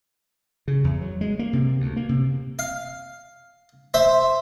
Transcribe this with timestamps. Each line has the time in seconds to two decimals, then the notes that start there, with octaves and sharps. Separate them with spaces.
0.68 C#3
0.84 E2
1.01 F#3
1.21 G#3
1.39 A#3
1.53 C3
1.80 D2
1.96 A#3
2.09 C3
2.59 F5
3.94 C5 E5